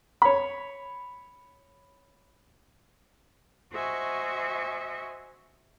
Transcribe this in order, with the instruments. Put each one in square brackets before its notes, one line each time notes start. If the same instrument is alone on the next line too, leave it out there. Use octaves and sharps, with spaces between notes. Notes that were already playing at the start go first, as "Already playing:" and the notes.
[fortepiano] C#5 B5
[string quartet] F#4 C5 D#5 E5 G#5 C#6